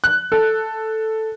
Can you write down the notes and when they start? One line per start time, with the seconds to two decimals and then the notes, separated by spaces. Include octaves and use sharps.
0.04 F#6
0.32 A4